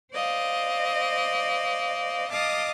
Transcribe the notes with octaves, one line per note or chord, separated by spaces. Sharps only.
C5 D5 D#5 F5
D#5 F5 A5 D6 D#6